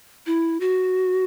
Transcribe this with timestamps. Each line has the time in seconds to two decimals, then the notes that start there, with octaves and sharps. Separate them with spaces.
0.26 E4
0.60 F#4